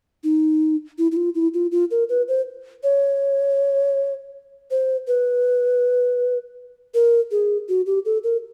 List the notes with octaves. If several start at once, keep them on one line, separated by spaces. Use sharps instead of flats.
D#4
E4
E4
F4
E4
F4
F4
A#4
B4
C5
C#5
C5
B4
A#4
G#4
F#4
G4
A4
A#4